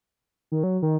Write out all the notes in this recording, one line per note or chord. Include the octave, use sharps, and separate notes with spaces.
D#3
F#3
D#3